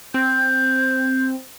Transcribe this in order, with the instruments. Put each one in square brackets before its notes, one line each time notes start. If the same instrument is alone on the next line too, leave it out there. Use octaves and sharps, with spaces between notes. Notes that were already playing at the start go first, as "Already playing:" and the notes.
[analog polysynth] C4 [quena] G6